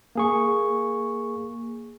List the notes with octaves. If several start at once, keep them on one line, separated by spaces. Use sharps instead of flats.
A#3 G#4 C#6